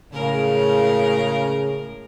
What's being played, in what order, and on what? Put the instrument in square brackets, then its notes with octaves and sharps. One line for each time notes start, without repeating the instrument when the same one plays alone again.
[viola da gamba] A2 G#3 A#4 [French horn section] C#3